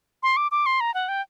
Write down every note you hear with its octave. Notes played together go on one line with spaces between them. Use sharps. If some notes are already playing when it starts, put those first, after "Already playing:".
C6
D6
D6
C6
A#5
F#5
G5